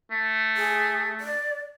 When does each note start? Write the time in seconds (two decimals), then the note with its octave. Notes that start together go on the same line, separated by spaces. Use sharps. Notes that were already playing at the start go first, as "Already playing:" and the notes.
0.11 A3
0.57 G#4
1.21 D5